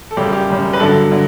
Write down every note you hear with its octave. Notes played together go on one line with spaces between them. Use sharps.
A4
F#2 C#3 G3 G4
G4
F#2 C#3 G3
B4
G2 D3 F#3 A4
D3 F#3